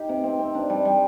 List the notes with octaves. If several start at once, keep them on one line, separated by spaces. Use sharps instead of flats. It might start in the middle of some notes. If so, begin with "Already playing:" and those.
Already playing: D#4 G4
C3
C4
C4
D4
G3
G3